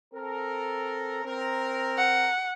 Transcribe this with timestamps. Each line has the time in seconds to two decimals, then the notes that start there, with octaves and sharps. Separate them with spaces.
0.14 C4 A4 A#4
1.25 C4 A#4
1.98 F#5